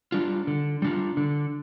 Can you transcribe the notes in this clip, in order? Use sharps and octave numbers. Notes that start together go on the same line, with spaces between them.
G3 D4 F4
D3
G3 D4 F4
D3